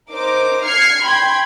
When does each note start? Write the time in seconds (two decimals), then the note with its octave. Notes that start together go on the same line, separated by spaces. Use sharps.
0.11 D#4 A#4 C5 D6
0.66 F6 G#6 C7 C#7
1.02 G5 B5 C6 G#6